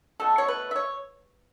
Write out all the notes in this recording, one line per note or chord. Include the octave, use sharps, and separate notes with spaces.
B2 A3 A4
C#5
B4
E5
C#5